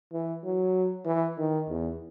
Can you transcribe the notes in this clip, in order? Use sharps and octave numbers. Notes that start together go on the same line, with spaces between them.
E3
F#3
E3
D#3
E2